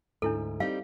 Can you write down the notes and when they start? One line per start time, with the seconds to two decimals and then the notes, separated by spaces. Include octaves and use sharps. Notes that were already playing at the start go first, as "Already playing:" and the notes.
0.22 D2 G#2 D4 E4 A4
0.60 G3 C4 D#4 F5